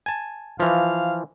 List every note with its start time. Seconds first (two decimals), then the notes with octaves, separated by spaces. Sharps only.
0.06 G#5 A5
0.60 E3 F3 F5